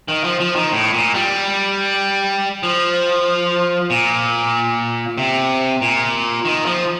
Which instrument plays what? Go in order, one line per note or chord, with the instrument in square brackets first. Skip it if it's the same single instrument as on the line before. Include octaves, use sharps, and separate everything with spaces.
[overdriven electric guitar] D#3
F3
F3
D#3
A2
A#2
G3
F3
A#2
C3
A#2
D#3
F3